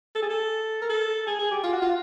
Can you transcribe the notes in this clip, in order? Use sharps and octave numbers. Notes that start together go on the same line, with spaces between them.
A4
G#4
A4
A#4
A4
G#4
G#4
G4
F4
F#4
F4